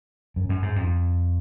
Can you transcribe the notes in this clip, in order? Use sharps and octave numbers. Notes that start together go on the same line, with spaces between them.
F#2
F#2
G#2
F2